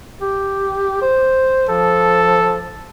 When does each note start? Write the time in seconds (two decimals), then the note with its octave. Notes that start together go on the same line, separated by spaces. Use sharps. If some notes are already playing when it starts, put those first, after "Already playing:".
0.21 G4
1.02 C5
1.69 F3 A4